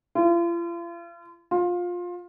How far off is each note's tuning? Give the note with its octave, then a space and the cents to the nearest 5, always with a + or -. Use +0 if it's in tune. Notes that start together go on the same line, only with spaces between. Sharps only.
F4 -40
F4 +20